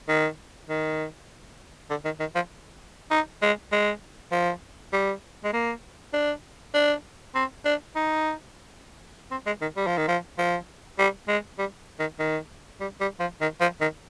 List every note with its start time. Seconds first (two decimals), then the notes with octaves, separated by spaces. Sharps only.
0.09 D#3
0.69 D#3
1.90 D3
2.05 D#3
2.20 D#3
2.35 F3
3.11 D#4
3.42 G#3
3.72 G#3
4.32 F3
4.93 G3
5.44 G#3
5.53 A#3
6.13 D4
6.74 D4
7.35 C4
7.65 D4
7.95 D#4
9.31 C4
9.46 G#3
9.61 D#3
9.77 G3
9.87 F3
9.98 D#3
10.08 F3
10.38 F3
10.98 G3
11.28 G#3
11.59 G3
11.99 D#3
12.19 D#3
12.80 G3
13.01 G3
13.20 F3
13.41 D#3
13.61 F3
13.81 D#3